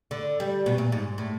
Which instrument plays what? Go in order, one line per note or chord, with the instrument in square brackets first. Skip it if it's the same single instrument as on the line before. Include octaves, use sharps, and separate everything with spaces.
[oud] D3
G3
B2
A#2
G#2
A2